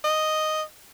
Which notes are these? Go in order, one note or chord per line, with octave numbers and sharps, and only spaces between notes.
D#5